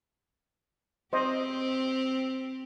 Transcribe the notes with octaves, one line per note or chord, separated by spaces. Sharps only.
C4 G4 C5 D#5